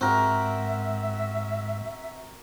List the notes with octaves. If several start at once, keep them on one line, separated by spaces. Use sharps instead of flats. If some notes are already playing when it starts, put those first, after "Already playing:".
G#2 C4 F#4 A#4 E5